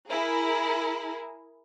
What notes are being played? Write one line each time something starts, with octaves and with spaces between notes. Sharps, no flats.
E4 G#4 A#4